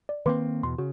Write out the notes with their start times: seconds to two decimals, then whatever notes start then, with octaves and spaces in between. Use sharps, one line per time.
0.09 D5
0.26 D#3 A#3 C4 B4 C6 D6
0.63 E2 B2 C6
0.78 C#3 F#4